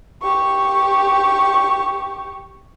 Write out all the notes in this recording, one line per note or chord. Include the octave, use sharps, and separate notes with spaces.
G4 C#6